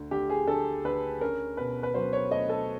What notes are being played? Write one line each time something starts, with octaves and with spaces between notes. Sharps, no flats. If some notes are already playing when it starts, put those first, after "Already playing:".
Already playing: D2
D2 G4
G#4
D2 A4
D2 B4
C#4 A#4
B2 B4
B4
F#3 C5
C#5
A3 D#5
A4